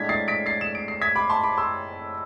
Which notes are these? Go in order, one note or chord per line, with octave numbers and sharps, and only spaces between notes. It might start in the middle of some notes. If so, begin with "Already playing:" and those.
Already playing: A2 G#3 D4 G#6 B6
A6 C7
B6 D7
A6 C7
E7
D7
C7
G#6 B6
B5 D6
A5 C6
B5 D6
C6 E6